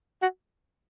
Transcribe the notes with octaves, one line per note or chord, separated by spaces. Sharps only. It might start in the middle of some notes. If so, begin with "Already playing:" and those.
F#4